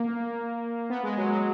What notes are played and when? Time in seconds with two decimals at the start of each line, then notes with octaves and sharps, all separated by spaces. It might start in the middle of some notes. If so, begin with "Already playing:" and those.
Already playing: A#3
0.90 B3
1.03 G#3
1.18 F#3
1.31 F#3